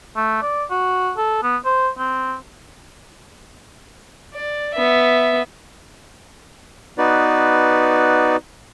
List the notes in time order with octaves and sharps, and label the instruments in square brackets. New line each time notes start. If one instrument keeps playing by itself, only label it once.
[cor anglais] A3
D5
F#4
A4
B3
C5
C4
[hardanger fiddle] D5
B3 E5
[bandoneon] B3 D#4 F#4 B4 D5